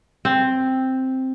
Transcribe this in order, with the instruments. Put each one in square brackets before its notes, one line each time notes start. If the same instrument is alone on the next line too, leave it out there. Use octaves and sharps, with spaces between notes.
[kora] C4